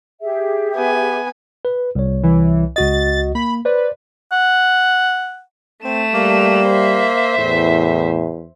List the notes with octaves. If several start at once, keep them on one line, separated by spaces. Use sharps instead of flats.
G4 G#4 E5
B3 G#5
B4
C2 C#5
E3
C#2 F#4 D#5 A6
A#3 B5
B4 C5 D5
F#5
A3 C4 E7
G3 A#3
C5 E5
E2 A2